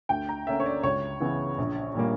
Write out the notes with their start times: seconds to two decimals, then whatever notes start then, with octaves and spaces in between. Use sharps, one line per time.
0.09 D2 G5
0.29 A#5
0.47 D3 A#3 C#4 E5
0.60 C#5
0.66 D5
0.83 C#2 C#5
1.20 C#3 E3 B3
1.58 A#1
1.95 A#2 G3 A#3